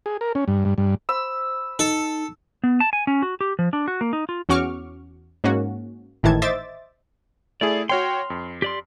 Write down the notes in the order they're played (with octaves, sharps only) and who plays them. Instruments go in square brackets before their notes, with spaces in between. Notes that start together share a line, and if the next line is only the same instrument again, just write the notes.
[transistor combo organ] G#4
A#4
C#4
G2
G2
G2
[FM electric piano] C5 B5 [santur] E6
[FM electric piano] D#4 [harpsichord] A4
[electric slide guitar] B3
A5
G#5
C#4
F#4
G4
F3
D4
F#4
A#3
D#4
F4
[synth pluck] E2 C#4 F#4 C#6 D6 F6
G#2 A#3 C#4 F#4
G#1 A2 D#3 E3 A5 G#6
C5 D#5 E5 D6 A6
[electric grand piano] A3 E4 G#4 [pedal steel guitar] D5
[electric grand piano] F#4 C#5 G5 [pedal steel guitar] C6 F6
[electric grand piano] F2
[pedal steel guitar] G4 D5 C6